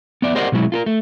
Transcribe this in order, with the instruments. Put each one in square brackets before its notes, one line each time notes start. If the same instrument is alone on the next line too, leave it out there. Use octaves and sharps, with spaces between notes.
[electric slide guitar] B3 D5 E5
G4 A#4 C5 D5 D#5 F#5
B2 F#3 G#3 E4
F4 A4 A#4
A3